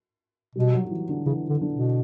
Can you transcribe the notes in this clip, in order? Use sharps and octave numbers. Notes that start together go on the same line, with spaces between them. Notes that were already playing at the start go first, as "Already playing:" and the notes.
B2 G3
F#3
F#3
E3
D3
C#3 E3
D3
D3
B2